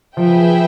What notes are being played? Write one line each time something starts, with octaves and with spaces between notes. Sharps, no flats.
F3 G#4 B4 E5 G5